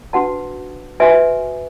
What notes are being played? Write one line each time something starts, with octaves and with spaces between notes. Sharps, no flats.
D4 F#4 B4 F#5 A5
F#4 B4 E5 G#5